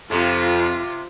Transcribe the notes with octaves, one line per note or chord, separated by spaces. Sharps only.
F2 C3 F4